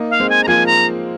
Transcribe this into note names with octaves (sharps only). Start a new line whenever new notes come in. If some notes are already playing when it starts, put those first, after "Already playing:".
Already playing: A#3 D#4
F5
G#3 C4
G#5
A#5
F3 A#3 G#5
A#5